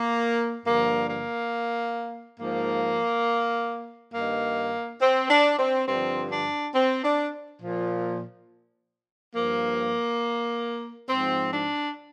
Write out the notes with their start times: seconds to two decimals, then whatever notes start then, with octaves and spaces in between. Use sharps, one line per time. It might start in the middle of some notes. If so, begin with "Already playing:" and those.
Already playing: A#3
0.66 G2 D3 F3 A#3
1.10 A#3
2.40 G#2 F3 A#3
4.14 G2 D#3 A#3
5.02 C4
5.30 D4
5.59 C4
5.88 G2 D3 F3 C4
6.31 D4
6.75 C4
7.04 D4
7.62 A#2 F3
9.35 G2 F3 A#3
11.10 G#2 F3 C4
11.53 D4